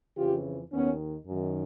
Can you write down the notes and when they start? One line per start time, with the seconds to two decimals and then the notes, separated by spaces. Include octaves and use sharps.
0.17 F2 C#3 E3 F4 G4
0.72 D#2 D#3 B3 C#4
1.27 F#2 D#3